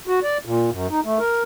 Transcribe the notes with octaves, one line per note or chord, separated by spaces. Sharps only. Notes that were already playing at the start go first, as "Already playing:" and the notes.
F#4
D5
A#2
F#2
D#4
A3
A#4